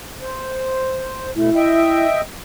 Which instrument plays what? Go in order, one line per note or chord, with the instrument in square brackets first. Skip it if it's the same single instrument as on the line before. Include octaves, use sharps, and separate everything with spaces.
[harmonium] C5
[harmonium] B2 A3 [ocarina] E4
[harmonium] D#5 E5 G5